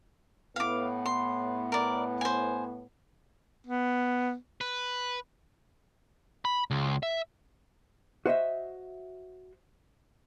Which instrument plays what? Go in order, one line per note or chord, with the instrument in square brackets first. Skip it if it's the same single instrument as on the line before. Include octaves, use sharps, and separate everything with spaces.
[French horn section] A2 B3 [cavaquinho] F5 D6
[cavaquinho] C6
A#4 D5
C5 G#5
[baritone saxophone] B3
[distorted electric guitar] B4
[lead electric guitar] B5
C#2
E5
[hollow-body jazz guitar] F#4 C5 D#5 E5